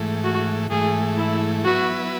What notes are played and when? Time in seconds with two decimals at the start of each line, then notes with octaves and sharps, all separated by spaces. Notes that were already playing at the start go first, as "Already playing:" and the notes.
Already playing: G#2 E3 A3
0.24 F#4
0.70 G#2 E3 A3 G#4
1.18 E4
1.65 F#3 B3 E4 F#4 B4